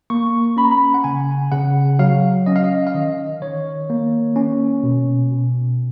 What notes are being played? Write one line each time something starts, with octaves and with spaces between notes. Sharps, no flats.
A#3 C#6
C#4 B5
A#5
B5
F#5
C#3 G#5
C#3 F#5
F#3 F5
C#4 D#5
F5
D#5
F5
D#3 D#5
D#3 C#5
A#3
C#4
B2
B2